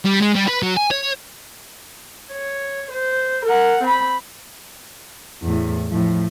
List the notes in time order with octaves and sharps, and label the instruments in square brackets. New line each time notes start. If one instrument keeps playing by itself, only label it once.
[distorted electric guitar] G3
G#3
G3
B4
F#3
G#5
C#5
[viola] C#5
C5
A#4 F#5
C4 B5
[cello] E2 A2
A2 F3